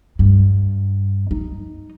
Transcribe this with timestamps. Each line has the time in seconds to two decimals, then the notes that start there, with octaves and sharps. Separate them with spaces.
0.19 G2
1.31 D#4